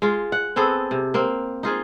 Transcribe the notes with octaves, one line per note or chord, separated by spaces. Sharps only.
G#3 F4
F#5
B3 C4 G#4 A4
C3
A#3 C4
D#4 F4 G#4 C5